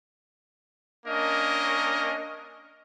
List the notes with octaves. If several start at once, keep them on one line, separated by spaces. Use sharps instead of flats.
A#3 C#4 D4 A#4 D#5